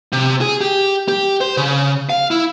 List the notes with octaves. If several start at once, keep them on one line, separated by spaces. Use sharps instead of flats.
C3
G#4
G4
G4
C5
C#3
F5
E4